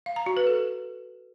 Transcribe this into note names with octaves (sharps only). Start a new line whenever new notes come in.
F5
A#5
F#4
B4
A4